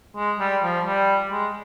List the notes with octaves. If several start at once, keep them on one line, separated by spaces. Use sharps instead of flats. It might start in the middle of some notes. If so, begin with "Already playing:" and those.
G#3
G3
F3
G3
G#3